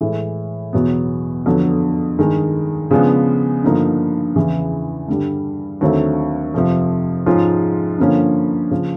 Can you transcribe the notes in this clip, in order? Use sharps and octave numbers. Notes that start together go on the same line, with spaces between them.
A2 E3 G#3
E2 B2 F#3 B3
F2 D3 F#3 B3
G2 D#3 G#3
C#3 F3 G#3 B3 D4
G2 D3 F3 A#3 D#4
E2 C#3 E3
G2 D3 G3
D#2 D3 F#3 A3 C4
F2 C3 F3
G#2 F3 G#3 C#4 F4
G2 D3 F3 A#3 C#4
C#3 F3